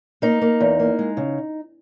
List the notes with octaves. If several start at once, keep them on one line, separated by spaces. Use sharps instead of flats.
A#3 D#4
A#3
E2
A#3
G#3
C#3